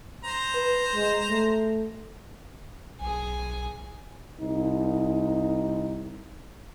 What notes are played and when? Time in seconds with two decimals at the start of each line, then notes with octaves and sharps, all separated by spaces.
0.24 C5 A#5
0.54 B4
0.95 G#3
1.30 A3
3.01 B1 G#4 G#5
4.40 C2 D#4